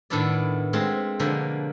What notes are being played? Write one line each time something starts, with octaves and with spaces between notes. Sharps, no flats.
A2 D#3 B3 D4 E4 D5
G#3 A3 C4 F4 F#4 G#4
B2 D3 F3 A#3 F#4